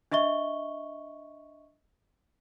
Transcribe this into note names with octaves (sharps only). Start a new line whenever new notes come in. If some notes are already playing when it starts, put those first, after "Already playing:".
D4 D#5 E5 C#6 G7